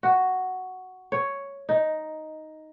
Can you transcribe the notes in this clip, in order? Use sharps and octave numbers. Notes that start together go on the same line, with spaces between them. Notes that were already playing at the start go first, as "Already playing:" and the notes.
F#4
C#5
D#4